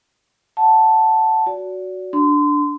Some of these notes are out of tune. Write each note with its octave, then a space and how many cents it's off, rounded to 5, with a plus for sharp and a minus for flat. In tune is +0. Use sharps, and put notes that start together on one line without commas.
F#5 +0 A5 +0
F#4 +0 D5 -30
D4 +0 C6 -30